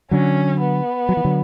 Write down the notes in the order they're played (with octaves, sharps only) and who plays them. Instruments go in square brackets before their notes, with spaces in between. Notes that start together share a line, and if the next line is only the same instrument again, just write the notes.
[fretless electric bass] D3 F#3 [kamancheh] C#4
[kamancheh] B3
[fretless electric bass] F#3
E3
D3 F#3